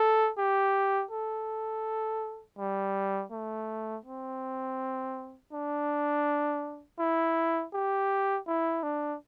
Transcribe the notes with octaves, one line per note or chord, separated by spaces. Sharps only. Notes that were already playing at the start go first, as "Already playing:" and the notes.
Already playing: A4
G4
A4
G3
A3
C4
D4
E4
G4
E4
D4